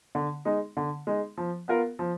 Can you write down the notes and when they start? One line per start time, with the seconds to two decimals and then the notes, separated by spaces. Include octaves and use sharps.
0.15 D3
0.45 G#3 D#4
0.77 D3
1.07 G#3 D#4
1.38 F3
1.68 B3 F4 A#4
1.99 F3